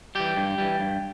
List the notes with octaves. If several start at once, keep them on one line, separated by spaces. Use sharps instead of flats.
E3 G3 G4
G2
E3 G3
G2